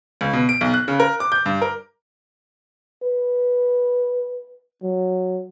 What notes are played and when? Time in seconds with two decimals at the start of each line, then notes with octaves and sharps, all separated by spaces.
0.21 C#2
0.33 B2
0.49 D7
0.61 B1
0.74 F#6
0.88 C#3
1.00 A#4
1.20 D6
1.32 G6
1.46 G2
1.62 A#4
3.03 B4
4.83 F#3